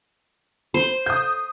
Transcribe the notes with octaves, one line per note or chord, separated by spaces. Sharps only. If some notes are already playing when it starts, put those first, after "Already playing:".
C5
D#6 G6